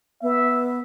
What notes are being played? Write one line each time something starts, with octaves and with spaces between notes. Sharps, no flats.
B3 E5